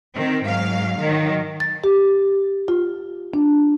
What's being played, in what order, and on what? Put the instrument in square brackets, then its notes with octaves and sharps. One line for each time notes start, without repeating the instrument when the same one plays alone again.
[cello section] D#3 C4
G#2 F#3 F5
D#3 F#3
[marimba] A6
G4
F4
D4